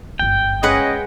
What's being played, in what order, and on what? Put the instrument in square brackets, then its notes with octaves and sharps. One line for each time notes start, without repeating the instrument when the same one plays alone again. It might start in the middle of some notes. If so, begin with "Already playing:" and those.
[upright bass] G1 F#2 [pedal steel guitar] G5
[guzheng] G#3 B4 F#5 [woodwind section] C#4 D#5